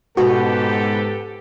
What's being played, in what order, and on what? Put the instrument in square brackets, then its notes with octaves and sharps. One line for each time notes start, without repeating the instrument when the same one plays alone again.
[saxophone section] G#2 [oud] B2 B3 C#4 [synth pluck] F#4 [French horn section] G4 A4 B4